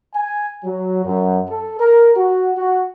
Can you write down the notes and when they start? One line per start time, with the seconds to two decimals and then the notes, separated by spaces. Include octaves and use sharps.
0.15 G#5
0.64 F#3
1.05 F#2
1.48 A4
1.80 A#4
2.17 F#4
2.57 F#4